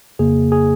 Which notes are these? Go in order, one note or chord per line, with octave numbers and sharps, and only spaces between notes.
F2 C#3 A#3 G#4
G#4